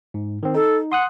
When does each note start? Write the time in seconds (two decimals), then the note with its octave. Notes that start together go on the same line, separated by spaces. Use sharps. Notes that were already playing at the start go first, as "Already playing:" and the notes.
0.14 G#2
0.43 D#3 C4
0.55 D#4 A4
0.92 F#5 C6 D#6 F#6